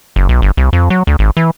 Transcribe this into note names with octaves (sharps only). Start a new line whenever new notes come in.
F#1
B1
G1
C2
F2
F#3
D2
G#1
E3